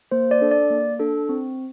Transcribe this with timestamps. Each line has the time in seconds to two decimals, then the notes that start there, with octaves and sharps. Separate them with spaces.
0.11 A#3 C5
0.31 D5
0.41 D4 A4
0.51 D5
0.71 A#3
1.00 D4 A4
1.29 C4